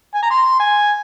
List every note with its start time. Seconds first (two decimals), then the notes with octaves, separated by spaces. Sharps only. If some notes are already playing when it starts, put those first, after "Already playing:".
0.15 G#5
0.23 A#5
0.31 C6
0.60 G#5